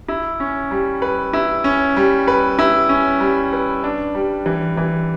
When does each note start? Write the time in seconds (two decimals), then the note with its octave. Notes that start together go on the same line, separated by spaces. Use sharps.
0.08 E4
0.40 C#4
0.71 G3
1.02 B4
1.33 E4
1.64 C#4
1.97 G3
2.28 B4
2.59 E4
2.89 C#4
3.20 G3
3.53 B4
3.84 D4
4.15 G3
4.46 E3
4.77 E3